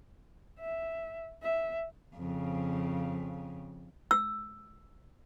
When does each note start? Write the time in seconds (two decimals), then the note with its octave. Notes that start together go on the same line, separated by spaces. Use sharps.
0.60 E5
1.42 E5
2.16 F2 C#3
4.11 E6